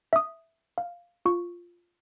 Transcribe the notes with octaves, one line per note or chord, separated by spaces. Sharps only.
E5 D#6
F5
F4 C#6